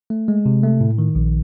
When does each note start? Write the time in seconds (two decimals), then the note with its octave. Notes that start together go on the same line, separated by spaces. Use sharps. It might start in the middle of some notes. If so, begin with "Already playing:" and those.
0.10 A3
0.28 G#3
0.46 C3
0.63 A3
0.81 A2
0.98 D#3
1.15 A#1